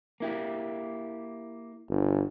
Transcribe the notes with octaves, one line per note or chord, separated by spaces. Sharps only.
A#3 E4 G4
G1